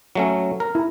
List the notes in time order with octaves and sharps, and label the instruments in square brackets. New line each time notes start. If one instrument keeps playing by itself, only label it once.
[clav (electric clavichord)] F#3 A3 C#4
A#4
[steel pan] E4